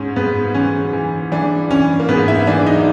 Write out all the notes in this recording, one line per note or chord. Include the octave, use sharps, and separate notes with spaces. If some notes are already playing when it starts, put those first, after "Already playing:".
Already playing: G#2 C#4
G#2 B3
E3 C#4
E3
E3 D4
E3 C#4
A#3
G#2 B3
E4
E3 D4
D#4